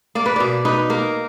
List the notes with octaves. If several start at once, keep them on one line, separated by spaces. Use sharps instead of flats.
A#3 D5
B4
B2 D5
D#4 B4
A#3 A#4